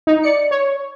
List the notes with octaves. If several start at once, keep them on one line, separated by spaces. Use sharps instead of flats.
D#4
D5 C#7
C#5